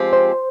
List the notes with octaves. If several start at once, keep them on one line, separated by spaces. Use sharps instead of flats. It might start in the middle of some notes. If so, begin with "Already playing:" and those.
Already playing: F3 G#3 C4 G4
C5